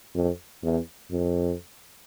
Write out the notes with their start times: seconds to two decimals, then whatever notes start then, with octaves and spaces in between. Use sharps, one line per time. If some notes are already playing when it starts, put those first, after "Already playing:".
0.15 F2
0.63 E2
1.11 F2